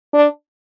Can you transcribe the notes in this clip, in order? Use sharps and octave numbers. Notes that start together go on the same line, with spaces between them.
D4